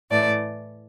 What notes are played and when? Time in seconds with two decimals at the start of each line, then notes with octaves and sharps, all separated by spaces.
0.10 A2 E3 A3 D5